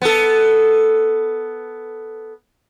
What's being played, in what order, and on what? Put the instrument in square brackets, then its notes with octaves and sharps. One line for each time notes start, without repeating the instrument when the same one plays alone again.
[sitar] B3 A4